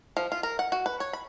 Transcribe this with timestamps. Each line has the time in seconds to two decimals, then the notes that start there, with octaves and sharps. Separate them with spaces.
0.17 F3
0.32 F4
0.43 A#4
0.59 F#5
0.72 F#4
0.86 B4
1.00 C#5
1.13 B5